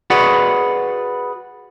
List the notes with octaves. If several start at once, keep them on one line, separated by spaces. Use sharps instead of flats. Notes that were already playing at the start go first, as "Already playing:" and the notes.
F#4 G#4 B4 D5 F#5